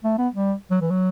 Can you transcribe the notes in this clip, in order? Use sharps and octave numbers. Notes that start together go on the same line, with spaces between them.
A3
B3
G3
F#3
E3
F#3